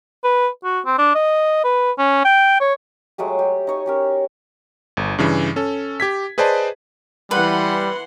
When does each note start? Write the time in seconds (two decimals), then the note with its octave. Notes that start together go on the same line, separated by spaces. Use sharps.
0.24 B4
0.64 F#4
0.85 C4
0.98 D4
1.15 D#5
1.64 B4
1.98 C#4
2.25 G5
2.60 C#5
3.18 F#3 G#3 A3 G4
3.39 G4
3.67 D#4 C#5 G#5
3.86 C#4 G4 A#4
4.97 G1
5.18 G2 C#3 E3
5.56 C#4 A4
6.00 G4 G#6 B6
6.38 G#4 B4 C5 D5 D#5 A5
7.31 E3 G3 B4 F#5 C6